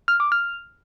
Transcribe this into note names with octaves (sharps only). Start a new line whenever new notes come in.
F6
D6
F6